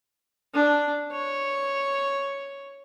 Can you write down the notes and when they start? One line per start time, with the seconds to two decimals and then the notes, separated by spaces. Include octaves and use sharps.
0.54 D4
1.12 C#5